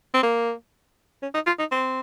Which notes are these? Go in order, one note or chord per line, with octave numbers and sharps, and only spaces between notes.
C4
A#3
C#4
D#4
F4
D#4
C4